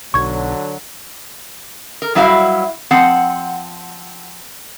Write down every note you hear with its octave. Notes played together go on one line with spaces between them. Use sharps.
B1 D3 F#3 C#6 G#6
A#4
F#3 G3 E4 F#4 E5 F5
F3 C4 F#5